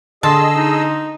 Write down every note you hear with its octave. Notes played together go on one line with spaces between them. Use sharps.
D3 G#4 D#5 A5 C6 E6
D#4